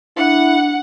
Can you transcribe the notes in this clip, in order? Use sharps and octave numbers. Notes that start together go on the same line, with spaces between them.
D4 E4 F#5